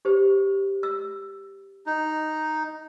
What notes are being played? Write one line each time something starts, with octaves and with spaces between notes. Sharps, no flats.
G4 C5
E6
D#4